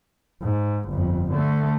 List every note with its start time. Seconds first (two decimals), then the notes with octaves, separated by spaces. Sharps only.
0.43 G#2
0.89 G1 F2
1.31 D3 A3